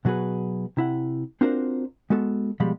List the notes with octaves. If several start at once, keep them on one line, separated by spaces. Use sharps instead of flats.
B2 F#3 F#4 G#4 B4
C3 E4 F#5
C4 D4 F4 F#4 A#4 C5
G#3 B3 F#4 A4
B2 F3 G3 G#3 B5